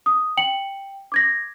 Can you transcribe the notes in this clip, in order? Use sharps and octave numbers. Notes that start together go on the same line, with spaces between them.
D#6
G5 C#7 F#7
D6 G#6 A#6